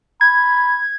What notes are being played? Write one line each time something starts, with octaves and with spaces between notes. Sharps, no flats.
B5 G#6